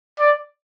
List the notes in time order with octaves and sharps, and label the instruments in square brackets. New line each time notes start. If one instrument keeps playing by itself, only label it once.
[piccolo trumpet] D5